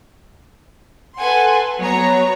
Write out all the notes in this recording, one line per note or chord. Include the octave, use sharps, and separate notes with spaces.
A4 B4 F#5 G#5 C6
F#3 B3 C#5 A#5